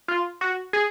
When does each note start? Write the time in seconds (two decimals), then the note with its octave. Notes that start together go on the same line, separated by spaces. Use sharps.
0.08 F4
0.41 F#4
0.73 G#4